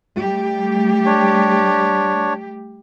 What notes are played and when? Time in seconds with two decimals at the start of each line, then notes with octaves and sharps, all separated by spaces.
0.18 G3 A3 G4
1.06 D4 C#5